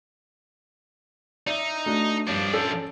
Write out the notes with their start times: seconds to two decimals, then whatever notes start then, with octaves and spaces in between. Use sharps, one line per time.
1.47 D#4 D5 E5
1.86 A3 D4 F#4
2.27 G2 F3 D4 C#5
2.53 C#4 A4 D5